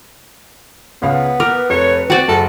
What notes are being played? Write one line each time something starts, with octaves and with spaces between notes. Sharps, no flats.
C#2 C#3 B3 F5
A#4 B4 D6
F1 C#5
C4 F#4 D5 F#5
F#1 A4